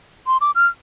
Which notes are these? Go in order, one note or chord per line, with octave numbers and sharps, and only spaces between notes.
C6
D6
F6